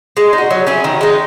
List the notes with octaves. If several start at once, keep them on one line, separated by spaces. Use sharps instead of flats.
G#3
D#4
F#4
F#3
C#4 E4 G#4
D#3
G#3 D#4